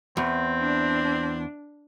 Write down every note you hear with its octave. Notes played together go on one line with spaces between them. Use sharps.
E2 C4
D4